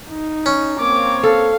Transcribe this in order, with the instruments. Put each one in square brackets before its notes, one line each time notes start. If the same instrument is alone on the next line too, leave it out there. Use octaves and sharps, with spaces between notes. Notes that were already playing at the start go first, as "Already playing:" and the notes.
[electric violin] D#4
[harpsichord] C#4
[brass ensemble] A#3 C4 C#5 [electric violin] D6
[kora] A4 [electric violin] F5